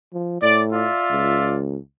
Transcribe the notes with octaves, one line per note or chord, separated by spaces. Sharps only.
F3
A2 D5
F4 D5 E5
C#2